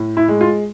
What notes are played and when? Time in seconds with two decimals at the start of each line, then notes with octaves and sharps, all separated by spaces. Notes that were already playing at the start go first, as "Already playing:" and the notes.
Already playing: A2
0.17 E4
0.28 G#3
0.41 F4